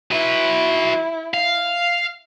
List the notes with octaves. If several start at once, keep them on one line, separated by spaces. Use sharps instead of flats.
F#3 E4 B4
F5